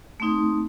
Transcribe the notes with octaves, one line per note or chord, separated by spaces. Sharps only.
A3 C4 D#4